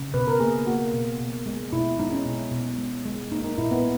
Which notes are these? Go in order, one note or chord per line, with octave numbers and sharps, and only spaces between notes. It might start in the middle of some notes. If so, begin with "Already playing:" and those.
Already playing: C#3
B2 B4
A#4
A#3 G#4
A#3 F#4
B2
B2
G#3
B2 E4
G#3 D#4
C#4
B2
B2
G#3
G#3
A#3 D#4
D#4
A#2 E4
B3